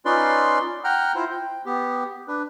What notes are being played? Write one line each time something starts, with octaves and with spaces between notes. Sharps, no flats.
C#4 D#4 F4 B4 D5 C6
F#5 G5 A#5 F6
E4 F4 C5
G5
B3 G4
D4 B4